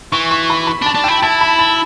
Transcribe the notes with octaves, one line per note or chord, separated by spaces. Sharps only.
E3 C#6
C#6
B5
B5
D4
A5
D4
E4 G5
E4 A5
B5
A5